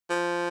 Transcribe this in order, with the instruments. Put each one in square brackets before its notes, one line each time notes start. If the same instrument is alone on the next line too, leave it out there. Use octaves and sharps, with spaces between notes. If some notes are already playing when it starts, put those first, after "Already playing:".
[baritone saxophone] F3